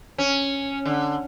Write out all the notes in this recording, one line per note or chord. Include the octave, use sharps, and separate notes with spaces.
C#4
D3